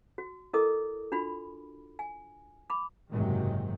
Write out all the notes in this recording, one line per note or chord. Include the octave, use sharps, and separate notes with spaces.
F#4
E4 A4 A#4 D#5 D6 D#6
D4 F4 F#4 B5
G#5
B5 D6
F#1 G#2 C3 D#3 F#3 G#3